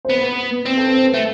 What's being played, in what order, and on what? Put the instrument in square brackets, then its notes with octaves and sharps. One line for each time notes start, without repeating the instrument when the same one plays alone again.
[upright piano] C5
[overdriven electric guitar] B3 [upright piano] B4
[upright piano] B4
[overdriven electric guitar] C4
[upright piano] A4
B4
C5
[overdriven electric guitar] A3